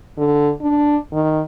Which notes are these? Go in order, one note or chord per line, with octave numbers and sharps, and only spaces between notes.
D3
D4
D#3